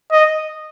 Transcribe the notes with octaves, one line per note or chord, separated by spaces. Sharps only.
D#5